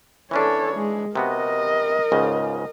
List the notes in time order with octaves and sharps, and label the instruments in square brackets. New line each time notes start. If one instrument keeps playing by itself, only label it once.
[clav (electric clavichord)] E3 C#4 D4 [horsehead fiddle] A4 C#5
[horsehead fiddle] G#3
[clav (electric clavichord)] C3 B3 F#4 [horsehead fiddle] A#4 D#5
[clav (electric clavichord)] C#2 G#2 C#3